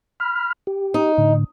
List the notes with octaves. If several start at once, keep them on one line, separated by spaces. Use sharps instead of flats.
B5 F6
G4
D#4
A2 D3